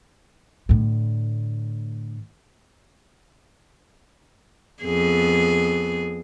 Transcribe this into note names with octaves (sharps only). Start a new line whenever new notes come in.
A2 D3
F2 B3 G#4